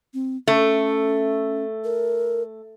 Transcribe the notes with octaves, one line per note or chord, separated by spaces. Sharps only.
C4
A3 C#4
A#4